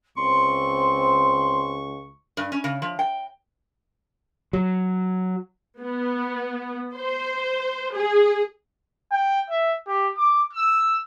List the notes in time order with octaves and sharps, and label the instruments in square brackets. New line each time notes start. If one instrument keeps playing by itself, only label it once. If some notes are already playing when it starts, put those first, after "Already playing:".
[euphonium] C#2 [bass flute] C4 [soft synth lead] C6 [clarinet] C#6
[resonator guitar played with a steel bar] G2
C#4
C#3
F3
G5
[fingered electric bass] F#3
[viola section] B3
C5
G#4
[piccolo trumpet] G5
E5
G4
D6
E6